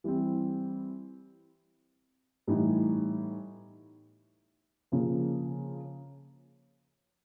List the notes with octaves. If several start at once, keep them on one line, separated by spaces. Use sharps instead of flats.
E3 G3 C4
A2 E3 G3 B3 D#4
C#3 F3 A#3